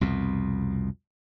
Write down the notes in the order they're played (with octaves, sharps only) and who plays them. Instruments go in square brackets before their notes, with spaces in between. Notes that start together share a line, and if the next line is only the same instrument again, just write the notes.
[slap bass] C2 F2 B2